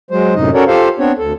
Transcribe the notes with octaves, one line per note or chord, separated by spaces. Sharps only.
F#3 G#3 C5
F#2 A2 C3 D#4 D#5
C#4 F#4 A4 A#4 C#5 D5
F4 G4 A4 C5 F5
B3 C4 D4 C#5
D2 A4